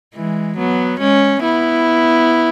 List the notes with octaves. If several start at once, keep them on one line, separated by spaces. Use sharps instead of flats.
E3 G#3
F#3 B3
G#3 C#4
B3 E4